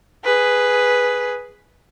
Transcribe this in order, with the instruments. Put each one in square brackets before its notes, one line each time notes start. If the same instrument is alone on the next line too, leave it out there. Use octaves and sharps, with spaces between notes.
[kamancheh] G#4 B4